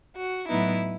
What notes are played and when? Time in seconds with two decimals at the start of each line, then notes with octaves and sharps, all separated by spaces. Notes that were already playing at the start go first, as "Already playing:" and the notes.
0.17 F#4
0.49 A2 F#3 B3 D#4 E4